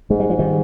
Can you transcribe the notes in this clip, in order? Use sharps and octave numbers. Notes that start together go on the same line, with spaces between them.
G#2 G#3
G3
F3
D#3 G3